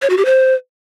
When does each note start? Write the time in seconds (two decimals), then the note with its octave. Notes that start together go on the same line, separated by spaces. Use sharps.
0.02 C#5
0.10 F#4
0.18 G4
0.25 C5